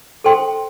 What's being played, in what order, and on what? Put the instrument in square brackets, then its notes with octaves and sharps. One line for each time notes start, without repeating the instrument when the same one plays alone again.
[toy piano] A4 C5 G5 C6